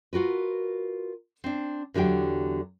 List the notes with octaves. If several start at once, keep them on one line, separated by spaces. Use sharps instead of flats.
F4 F#4 A#4 B4
C4 D4
E2 D3 F#3 G4 G5